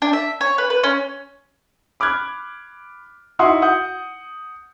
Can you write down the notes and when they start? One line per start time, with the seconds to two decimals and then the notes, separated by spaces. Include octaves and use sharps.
0.02 D4
0.13 E5
0.41 C#5
0.58 B4
0.70 B4
0.83 C#4
2.00 B5 D6 F6 F#6 G#6
3.39 D#4 E4 F#4 F#5 C6 D#6
3.62 F#5 D#6 G6